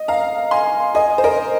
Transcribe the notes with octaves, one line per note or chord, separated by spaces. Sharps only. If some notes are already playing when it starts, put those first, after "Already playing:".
Already playing: D#5
F5 A#5
G#5 C6
D#5 G#5
C5
A#4 D#5